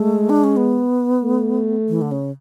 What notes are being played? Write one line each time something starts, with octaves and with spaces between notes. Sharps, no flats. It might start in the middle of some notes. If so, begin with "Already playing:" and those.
Already playing: G#3 A3
D4
C#4
B3
A3
E3
D3
C#3